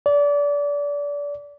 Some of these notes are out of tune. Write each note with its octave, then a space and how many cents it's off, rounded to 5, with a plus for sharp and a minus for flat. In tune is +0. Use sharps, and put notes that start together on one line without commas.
D5 -30